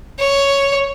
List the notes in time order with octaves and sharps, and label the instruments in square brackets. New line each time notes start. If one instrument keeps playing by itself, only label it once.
[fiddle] C#5